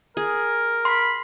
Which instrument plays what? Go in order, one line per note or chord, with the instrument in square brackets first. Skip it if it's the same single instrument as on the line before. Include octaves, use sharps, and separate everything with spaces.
[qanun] G#4 [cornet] A#4
[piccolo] B5 [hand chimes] C6